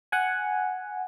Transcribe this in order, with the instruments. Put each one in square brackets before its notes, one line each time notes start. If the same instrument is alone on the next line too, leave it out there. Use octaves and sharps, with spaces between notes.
[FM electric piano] F#5 G#5